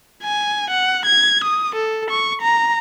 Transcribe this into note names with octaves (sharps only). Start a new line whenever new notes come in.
G#5
F#5
G#6
D#6
A4
C#6
A#5